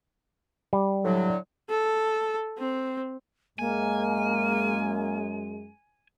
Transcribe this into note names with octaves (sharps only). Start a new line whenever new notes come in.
G3
A2 D3 F#3
A4
C4
F#2 G#3 A#3 G#5